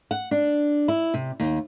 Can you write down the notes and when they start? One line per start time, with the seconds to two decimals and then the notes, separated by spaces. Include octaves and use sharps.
0.11 F#5
0.31 D4
0.88 E4
1.14 C3
1.40 D#2